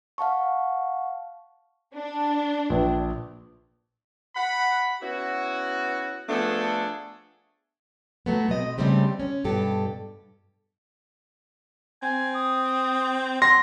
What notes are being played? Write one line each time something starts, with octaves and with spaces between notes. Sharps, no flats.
F5 F#5 A5 C#6
D4
A#1 B4
F#5 B5
B3 C#4 E4 F#4
F3 A3 B3 D4 G#4 A4
F#3 A3 B3
B2 C4 D#5
C#3 E3 G3 A3 C4 G4
C#4
G2 B2 G4 A4
C4 G#5
D#6
F#3 C6 A#6